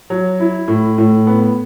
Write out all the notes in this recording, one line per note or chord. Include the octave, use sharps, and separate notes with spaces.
F#3
E4
A2
A2
B3